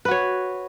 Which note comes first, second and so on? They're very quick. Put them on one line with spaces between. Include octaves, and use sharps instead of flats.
B4 F#4 C#5